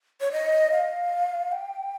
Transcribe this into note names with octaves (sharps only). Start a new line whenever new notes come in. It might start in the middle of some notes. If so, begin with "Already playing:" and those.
C#5
D#5
F5
G5